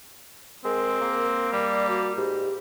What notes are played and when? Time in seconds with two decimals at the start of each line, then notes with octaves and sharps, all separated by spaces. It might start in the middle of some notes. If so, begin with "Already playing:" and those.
0.64 G#3 C4 A#4
1.01 A#3
1.52 G3 D5
1.89 F#4
2.17 G#2 G4